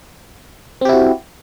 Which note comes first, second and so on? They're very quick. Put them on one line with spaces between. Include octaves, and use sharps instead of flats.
C4 G4 E4 F#4